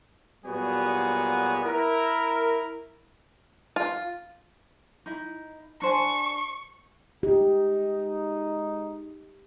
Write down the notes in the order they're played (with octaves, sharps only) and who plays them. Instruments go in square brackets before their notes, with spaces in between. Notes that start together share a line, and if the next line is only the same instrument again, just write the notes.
[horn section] A#2 F#3 G3 B3 F#4 G#4
E4 A#4
[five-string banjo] F4
[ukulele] D#4 E4
[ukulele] D4 C5 G#5 [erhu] C#6
[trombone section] G#3 D#4 [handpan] G4